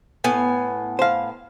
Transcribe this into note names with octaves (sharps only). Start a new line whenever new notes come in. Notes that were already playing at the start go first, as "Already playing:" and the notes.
A2 B3 G#5
C5 F5